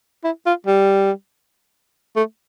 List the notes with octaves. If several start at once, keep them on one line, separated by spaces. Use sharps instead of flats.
E4
F4
G3
A3